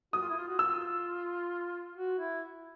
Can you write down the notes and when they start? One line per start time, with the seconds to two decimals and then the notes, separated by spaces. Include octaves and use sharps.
0.13 F#4 D#6
0.21 F4
0.29 E4
0.36 F4
0.48 F#4
0.59 F4 E6
1.95 F#4
2.19 E4